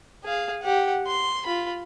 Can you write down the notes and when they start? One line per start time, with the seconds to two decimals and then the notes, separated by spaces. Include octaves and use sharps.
0.24 G#4 F5
0.62 G4 F#5
1.06 C6
1.46 F4 B5